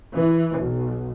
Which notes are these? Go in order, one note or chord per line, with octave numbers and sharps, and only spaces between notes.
E3
B1